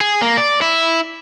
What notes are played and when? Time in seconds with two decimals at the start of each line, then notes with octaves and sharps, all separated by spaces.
0.01 G#4
0.22 A#3
0.37 D5
0.61 E4